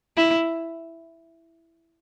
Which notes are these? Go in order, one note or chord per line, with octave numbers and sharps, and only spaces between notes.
E4